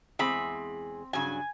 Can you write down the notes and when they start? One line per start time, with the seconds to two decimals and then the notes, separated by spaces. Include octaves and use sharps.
0.19 E2 G#3 C4 G#4 B5
1.13 G2 C#3 F#3 G#5